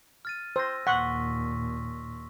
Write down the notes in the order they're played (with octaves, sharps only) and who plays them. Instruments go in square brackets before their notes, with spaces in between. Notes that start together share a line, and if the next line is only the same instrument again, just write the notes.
[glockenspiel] F6 A6 D#7
[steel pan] C5 [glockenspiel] E6 A#6
[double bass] D#2 A#2 [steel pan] F#5 [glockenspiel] C6 C#6 B6